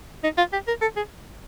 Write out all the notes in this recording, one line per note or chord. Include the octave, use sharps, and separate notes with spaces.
D#4
F4
G4
A#4
A4
G#4